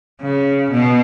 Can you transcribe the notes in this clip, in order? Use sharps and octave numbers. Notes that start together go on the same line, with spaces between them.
C#3
B2